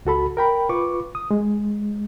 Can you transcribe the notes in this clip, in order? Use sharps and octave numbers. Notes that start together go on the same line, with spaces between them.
C#2 F#4 A4 B5
A#4 G5 B5
F4 B4 C#6 D6
D#6
G#3